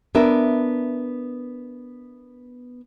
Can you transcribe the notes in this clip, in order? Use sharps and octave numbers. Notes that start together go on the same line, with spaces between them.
B3 D4 A#4 E5